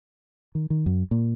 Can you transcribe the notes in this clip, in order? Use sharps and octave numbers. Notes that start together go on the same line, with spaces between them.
D#3
D#3
F#2
A#2